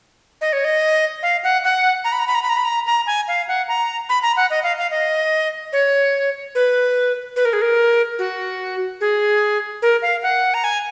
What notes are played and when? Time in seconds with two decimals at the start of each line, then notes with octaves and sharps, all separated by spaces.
0.41 D#5
0.53 C#5
0.64 D#5
1.23 F5
1.44 F#5
1.64 F#5
2.04 A#5
2.12 B5
2.19 A#5
2.28 B5
2.35 A#5
2.43 B5
2.49 A#5
2.57 B5
2.65 A#5
2.86 A#5
3.07 G#5
3.28 F5
3.48 F#5
3.68 A#5
4.09 B5
4.23 A#5
4.37 F#5
4.50 D#5
4.63 F5
4.78 F5
4.91 D#5
5.73 C#5
6.55 B4
7.36 B4
7.45 A#4
7.53 G#4
7.62 A#4
8.19 F#4
9.01 G#4
9.82 A#4
10.02 F5
10.23 F#5
10.54 A#5
10.64 G#5